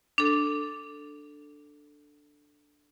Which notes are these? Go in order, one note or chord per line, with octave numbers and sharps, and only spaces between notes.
D4 A4